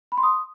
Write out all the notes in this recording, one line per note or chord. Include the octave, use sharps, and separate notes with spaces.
B5
C6
D#6